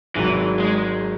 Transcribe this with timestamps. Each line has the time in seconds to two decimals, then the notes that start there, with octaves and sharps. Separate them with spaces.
0.15 G#1 G#2 D#3 E3 F#3
0.59 G#3